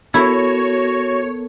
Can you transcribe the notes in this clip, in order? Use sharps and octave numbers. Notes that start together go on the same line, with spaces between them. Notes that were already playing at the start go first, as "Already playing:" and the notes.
B3 E4 F#4 A4 A#4 C#5